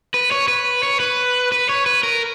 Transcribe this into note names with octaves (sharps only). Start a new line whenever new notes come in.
B4
C#5
B4
C#5
B4
B4
C#5
B4
A#4